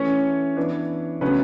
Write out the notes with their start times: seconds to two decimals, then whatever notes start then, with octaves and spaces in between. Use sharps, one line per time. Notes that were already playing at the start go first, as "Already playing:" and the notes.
Already playing: E3 A3 C#4 C#5
0.57 E3 B3 D4
1.21 C#3 F#3 A3 B3 C#4 B4